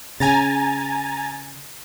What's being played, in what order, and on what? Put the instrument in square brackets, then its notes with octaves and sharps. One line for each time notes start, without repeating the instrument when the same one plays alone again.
[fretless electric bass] C#3 [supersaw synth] G#5 A#5 A6